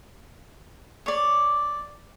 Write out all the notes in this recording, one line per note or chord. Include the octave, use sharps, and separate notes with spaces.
C#5 D5